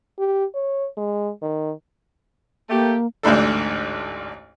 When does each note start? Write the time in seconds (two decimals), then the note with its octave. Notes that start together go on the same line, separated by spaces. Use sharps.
0.19 G4
0.55 C#5
0.97 G#3
1.42 D#3
2.70 A3 A#3 G4
3.23 A1 D2 G#2 D4 A4